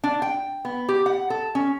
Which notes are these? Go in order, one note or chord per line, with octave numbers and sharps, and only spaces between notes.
D4
G5
B3
G4
F#5
A4
C#4